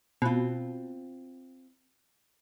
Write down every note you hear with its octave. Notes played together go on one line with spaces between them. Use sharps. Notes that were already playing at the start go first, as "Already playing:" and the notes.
B2 C4 F4